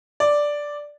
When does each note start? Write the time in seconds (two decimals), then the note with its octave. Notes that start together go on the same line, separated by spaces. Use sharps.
0.20 D5